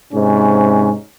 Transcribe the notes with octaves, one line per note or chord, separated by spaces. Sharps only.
G#2 C3 C#4